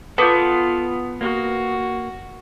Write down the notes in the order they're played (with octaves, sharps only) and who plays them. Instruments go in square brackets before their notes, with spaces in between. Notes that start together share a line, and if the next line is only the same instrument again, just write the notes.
[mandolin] B3 [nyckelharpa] F4 [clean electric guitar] A4 [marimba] B4 D6 G6
[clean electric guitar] A#3 [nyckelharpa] F#4